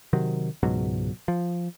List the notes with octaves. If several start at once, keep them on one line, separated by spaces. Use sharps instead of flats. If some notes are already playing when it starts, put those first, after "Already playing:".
C3 D#3 F#3
C#2 G#2 B2 F#3
F3